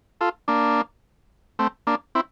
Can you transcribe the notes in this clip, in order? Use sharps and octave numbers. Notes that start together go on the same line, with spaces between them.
F4 A4
A#3 D4
A3 C4
A#3 D4
C4 E4